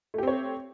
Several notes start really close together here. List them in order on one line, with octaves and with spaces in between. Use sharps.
A3 G4 C4 C#5